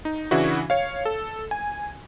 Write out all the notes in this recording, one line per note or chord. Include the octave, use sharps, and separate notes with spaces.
D#4
C#3 E3 D4 E4 F#4
C#5 F5
A4
G#5